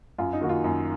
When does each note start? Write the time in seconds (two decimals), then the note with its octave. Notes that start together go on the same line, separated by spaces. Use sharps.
0.18 F#2 F4
0.33 D#4
0.41 D#3 A#3 F#4
0.49 F4
0.64 F#2